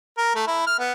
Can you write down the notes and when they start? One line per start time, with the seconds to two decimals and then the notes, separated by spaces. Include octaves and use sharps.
0.18 A#4
0.35 A3
0.47 E4
0.67 F6
0.79 B3